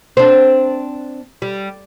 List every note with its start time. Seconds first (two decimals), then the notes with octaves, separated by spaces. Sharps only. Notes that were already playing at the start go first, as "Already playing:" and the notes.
0.17 C4 D4
1.42 G3